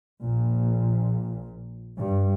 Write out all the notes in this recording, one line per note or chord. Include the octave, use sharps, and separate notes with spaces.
A#1 A#2
G2